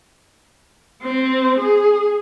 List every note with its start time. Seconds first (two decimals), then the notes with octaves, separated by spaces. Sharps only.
1.02 C4
1.59 G#4